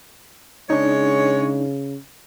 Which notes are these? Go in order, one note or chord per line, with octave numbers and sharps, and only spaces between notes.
C#3 G#3 D4 D#4 C#5